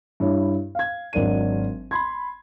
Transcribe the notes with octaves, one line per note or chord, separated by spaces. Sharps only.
G2 E4 C#5
F5 G#6
G#1 F#3 D4 A#4 D#7
B5 C6 G#6